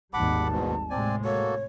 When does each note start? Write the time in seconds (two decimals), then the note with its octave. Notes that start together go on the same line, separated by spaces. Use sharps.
0.14 G#1 D#2 G3 F#5 A5 B5 D6
0.52 E2 G#2 B2
0.90 A2 C3 G#3 C4 D5 G#5
1.24 A#3 F#4 A4 C#5